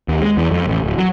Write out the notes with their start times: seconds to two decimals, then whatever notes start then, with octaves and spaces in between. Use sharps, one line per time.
0.08 D#2
0.22 G#3
0.37 E2
0.51 F2
0.68 A1
0.84 D1
0.98 F#3